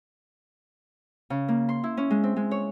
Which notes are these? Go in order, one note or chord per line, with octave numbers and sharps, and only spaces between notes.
C#3
A#3
C6
E4
C#4
G#3
C4
G#3
C#5